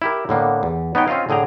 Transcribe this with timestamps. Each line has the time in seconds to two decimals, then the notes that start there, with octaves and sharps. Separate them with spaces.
0.02 E4 G4 A#4
0.29 A2 D3 A#3 B3
0.63 E2
0.95 B3 D#4 C#5 G5 G#5
1.08 C4 C#4 F4 D#5 F5
1.29 A2 D3 G#4 G5 A#5